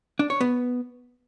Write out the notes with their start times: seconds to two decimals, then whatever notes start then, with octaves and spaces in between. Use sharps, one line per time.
0.19 D4
0.30 C#5
0.41 B3